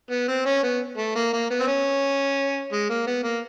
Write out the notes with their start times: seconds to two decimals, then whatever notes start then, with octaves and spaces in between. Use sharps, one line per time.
0.11 B3
0.28 C4
0.46 C#4
0.63 B3
0.97 A3
1.15 A#3
1.33 A#3
1.50 B3
1.60 C4
1.67 C#4
2.72 G#3
2.89 A#3
3.07 B3
3.24 A#3